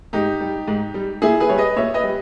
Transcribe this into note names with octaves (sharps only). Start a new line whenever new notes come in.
G#2 D#4 G4
G3
G#2
G3
A#2 E4 G#4
G#4 B4
G3 C#5
B4 D#5
A#2 C#5 E5
B4 D#5
G3